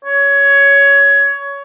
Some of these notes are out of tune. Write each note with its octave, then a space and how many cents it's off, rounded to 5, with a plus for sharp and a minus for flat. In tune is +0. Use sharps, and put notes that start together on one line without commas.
C#5 +15